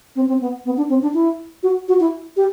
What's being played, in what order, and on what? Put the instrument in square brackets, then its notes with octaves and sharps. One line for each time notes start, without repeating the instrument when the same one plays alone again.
[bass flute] C4
C4
B3
B3
D4
C4
D4
E4
F#4
F#4
E4
G4